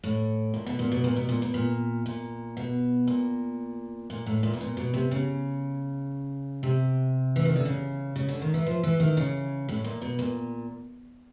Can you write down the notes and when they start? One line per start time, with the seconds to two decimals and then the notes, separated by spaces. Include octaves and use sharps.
0.04 A2
0.54 A#2
0.66 B2
0.79 A#2
0.92 B2
1.04 A#2
1.16 B2
1.29 A#2
1.42 B2
1.54 A#2
2.06 A#2
2.57 B2
3.07 A#2
4.10 A#2
4.26 A2
4.43 A#2
4.54 B2
4.61 A#2
4.77 B2
4.94 C3
5.11 C#3
6.63 C3
7.36 E3
7.45 D#3
7.56 D3
7.65 C#3
8.16 C#3
8.29 D3
8.42 D#3
8.54 E3
8.67 F3
8.83 E3
9.00 D#3
9.17 C#3
9.69 A2
9.84 A#2
10.02 B2
10.19 A#2